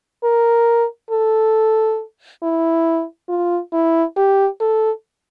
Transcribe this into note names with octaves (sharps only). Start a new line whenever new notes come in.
A#4
A4
E4
F4
E4
G4
A4